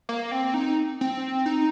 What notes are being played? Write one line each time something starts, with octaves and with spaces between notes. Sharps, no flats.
A#3
C4
D#4
C4
D#4